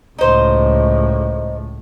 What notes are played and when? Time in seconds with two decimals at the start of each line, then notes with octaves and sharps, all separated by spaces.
0.19 C#2 A2 D#4 C5